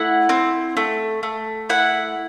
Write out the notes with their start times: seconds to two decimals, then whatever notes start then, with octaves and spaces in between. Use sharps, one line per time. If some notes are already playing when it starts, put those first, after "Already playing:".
Already playing: A3 E4 F#5
0.29 C4
0.77 A3
1.23 A3
1.69 E4 F#5